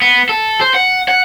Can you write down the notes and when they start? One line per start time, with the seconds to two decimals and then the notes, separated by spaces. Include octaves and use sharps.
0.02 B3
0.29 A4
0.61 C5
0.75 F#5
1.09 F#5